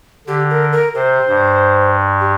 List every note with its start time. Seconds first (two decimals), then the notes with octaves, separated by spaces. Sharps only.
0.27 D3 G4
0.50 A#4
0.72 A#4
0.95 C3 C5
1.29 G2
2.21 G4